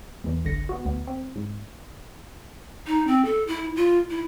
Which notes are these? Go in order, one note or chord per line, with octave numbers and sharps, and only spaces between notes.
E2 E3
G1 C2 D3 A#6 C#7
B3 F#4
D2 B3
C4
G#2
D#4
C4
A4
E4
F4
E4